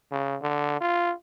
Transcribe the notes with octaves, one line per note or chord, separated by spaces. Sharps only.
C#3
D3
F4